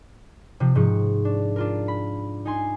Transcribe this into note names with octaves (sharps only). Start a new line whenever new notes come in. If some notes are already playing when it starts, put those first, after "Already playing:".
C3 F3
G#2 F3 C#6
D4
D4 F4 A#4
B5
D#4 G#5 C6